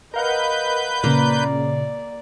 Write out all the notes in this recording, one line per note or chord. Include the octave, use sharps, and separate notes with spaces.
A#4 B4 D#5 F5 F#5 G6
A#2 C#3 A#3 D5